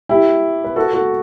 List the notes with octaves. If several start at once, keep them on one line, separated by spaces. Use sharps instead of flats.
E4 G4
B4
F#4 A4
F#4 A4